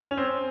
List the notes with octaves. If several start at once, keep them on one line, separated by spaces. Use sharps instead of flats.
C#4
C4